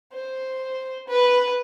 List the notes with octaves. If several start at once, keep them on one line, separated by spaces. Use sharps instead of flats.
C5
B4